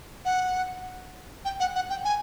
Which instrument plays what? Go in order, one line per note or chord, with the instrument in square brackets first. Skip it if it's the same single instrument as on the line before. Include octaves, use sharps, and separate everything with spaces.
[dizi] F#5
G5
F#5
F#5
G5
G#5